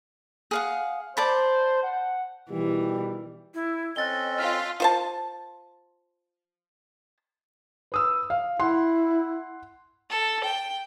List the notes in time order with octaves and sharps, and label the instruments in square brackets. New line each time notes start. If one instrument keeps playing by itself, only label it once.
[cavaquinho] G#4 F5 F#5
[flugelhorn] C5 [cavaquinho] D5 A5 B5
[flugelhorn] F#5
[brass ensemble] B2 D#3 G3 [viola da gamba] E3
[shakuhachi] E4
[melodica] C4 C#4 A4 [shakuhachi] D#5 [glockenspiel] F#6 A6 G7
[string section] F4 [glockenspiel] F6 B6
[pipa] F4 C5 A5
[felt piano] B4 D#6 E6
F5
[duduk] E4 [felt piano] F#5 C6
[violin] A4
G5